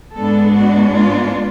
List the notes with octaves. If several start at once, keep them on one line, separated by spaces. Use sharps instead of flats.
G#2 G#3 B3 D4 A4
F#4
F4